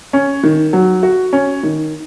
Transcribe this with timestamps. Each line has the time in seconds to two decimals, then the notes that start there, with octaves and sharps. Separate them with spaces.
0.13 C#4
0.43 D#3
0.73 F#3
1.03 F#4
1.33 C#4
1.63 D#3